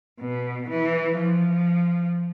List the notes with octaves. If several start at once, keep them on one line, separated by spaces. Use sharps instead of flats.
B2
E3
F3